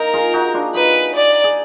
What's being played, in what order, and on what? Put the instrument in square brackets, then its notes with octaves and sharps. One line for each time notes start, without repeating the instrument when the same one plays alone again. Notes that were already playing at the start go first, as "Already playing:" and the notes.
Already playing: [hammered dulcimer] A#3 D#4 [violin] A#4
[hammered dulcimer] F4 G#4
D#4 F#4
D4 F4
[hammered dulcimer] D#4 F#4 [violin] B4
[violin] D5
[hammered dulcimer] G#4